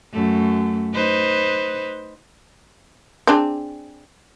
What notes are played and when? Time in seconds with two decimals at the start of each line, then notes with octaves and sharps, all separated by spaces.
0.13 F#2 A3
0.94 D#4 B4 C5
3.27 C4 D4 G#4